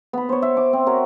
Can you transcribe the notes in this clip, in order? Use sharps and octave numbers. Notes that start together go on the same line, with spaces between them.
B3 B5
C5 C#5
E5
D6
C4
F#4 A#4 C#5